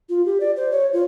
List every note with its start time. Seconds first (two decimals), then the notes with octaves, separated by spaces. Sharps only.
0.09 F4
0.26 G4
0.40 D5
0.56 C5
0.71 C#5
0.93 F4